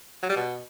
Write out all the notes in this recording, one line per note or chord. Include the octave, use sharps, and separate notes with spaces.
F#3
G3
B2